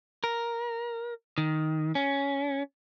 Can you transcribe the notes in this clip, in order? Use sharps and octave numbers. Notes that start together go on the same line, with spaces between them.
A#4
D#3
C#4